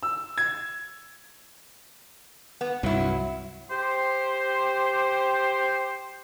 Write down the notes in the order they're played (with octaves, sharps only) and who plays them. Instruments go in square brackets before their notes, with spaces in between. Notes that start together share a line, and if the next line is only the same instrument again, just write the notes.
[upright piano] E6
G#6
[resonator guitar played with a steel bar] B3
[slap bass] C2 G2 [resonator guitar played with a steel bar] F#3 E4
[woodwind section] G4 C5